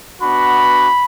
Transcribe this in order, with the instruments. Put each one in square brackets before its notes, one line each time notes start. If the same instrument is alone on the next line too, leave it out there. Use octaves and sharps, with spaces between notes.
[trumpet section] B3 D4 F#4 B5